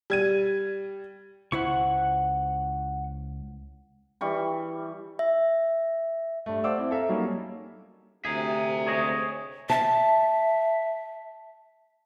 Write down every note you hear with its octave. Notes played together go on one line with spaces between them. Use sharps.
G3 G#6 D#7
C#2 E4 C5 F#5 C#6
E3 G3 C#6
E5
G2 A3
C5 D5 F5 F#5 D6 E6
C4 E4
A4 E5 F5 A#5
F#3 G3 A#3 C#4 D#4
D2 C3 G#4 E5 A#5
G#4 C#5 D#5
E5 A5